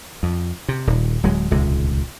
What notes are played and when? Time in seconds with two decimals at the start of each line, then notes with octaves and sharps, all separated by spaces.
0.23 F2
0.68 C3
0.87 D#1
1.23 D1 F#3 G#3
1.51 D#1 C#2 C3 G#3